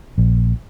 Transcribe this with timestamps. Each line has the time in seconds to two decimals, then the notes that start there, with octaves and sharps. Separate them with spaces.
0.18 A#1